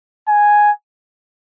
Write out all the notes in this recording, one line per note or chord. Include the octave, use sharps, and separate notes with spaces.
G#5